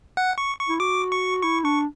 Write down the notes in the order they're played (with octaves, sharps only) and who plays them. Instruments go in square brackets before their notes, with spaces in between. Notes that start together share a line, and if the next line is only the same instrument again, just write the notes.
[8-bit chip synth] F#5
C#6
C#6
[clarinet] E4
[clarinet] F#4 [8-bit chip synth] D6
[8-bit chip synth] C#6
[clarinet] E4 [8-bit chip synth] C#6
[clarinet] D4 [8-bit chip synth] C#6